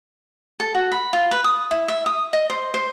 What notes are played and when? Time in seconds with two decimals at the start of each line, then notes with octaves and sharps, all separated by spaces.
0.60 A4
0.75 F#4
0.92 B5
1.13 F4
1.31 B4
1.44 D#6
1.71 E4
1.88 E5
2.06 D#6
2.33 D#5
2.50 C5
2.74 C5